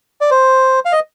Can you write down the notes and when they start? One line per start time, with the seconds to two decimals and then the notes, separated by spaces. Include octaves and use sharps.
0.21 D5
0.31 C5
0.85 F5
0.92 D#5